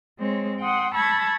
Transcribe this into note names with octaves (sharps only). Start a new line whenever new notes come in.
G#3 C4 C#5
F#5 G5 C6 D#6
A5 B5 C#6 E6 G#6 A#6